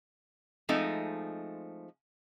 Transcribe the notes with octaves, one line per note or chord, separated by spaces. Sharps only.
F3 G#3 A3 C4 D#4